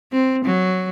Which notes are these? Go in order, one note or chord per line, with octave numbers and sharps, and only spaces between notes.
C4
F#3